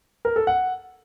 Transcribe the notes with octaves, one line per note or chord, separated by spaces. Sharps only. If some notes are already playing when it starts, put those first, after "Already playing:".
A#4
A4
F#5